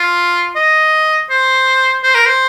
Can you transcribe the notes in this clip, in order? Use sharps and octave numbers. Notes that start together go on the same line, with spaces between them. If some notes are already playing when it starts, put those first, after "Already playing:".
Already playing: F4
D#5
C5
C5
A#4
C5